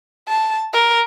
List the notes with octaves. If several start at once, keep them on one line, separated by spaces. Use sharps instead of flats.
A5
A#4